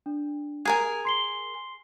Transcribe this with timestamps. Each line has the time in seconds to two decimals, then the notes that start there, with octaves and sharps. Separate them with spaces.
0.06 D4
0.65 G#4 A#4 G#5 G#6
1.05 C6 C7 G7